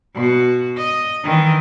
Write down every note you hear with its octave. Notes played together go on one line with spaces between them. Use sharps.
B2 F#4
D#5
D#3 E3